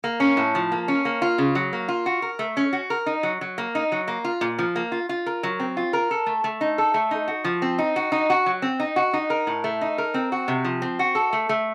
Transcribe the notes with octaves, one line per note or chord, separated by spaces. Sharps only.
A#3
C#4
A2
F3
A#3
C#4
A#3
F4
C#3
F#3
A#3
F4
F#4
A#4
A3
C#4
F#4
A#4
D#4
F#3
F#3
A#3
D#4
F#3
A#3
F4
A#2
F3
A#3
F4
F4
A#4
F#3
C4
F4
A#4
A4
A3
A3
D#4
A4
A3
D#4
F#4
F3
C4
D#4
F#4
D#4
F#4
F#3
C4
D#4
F#4
D#4
A#4
A2
A3
D#4
A#4
C4
F#4
C3
F3
C4
F#4
A4
A3
A3